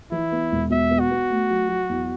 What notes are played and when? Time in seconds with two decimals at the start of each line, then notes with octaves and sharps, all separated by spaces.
0.11 E3 E4
0.32 B3
0.51 E1
0.70 B2 E5
0.90 B3
1.00 F#4
1.10 B3
1.30 A3
1.50 F#3
1.68 F#3
1.89 E2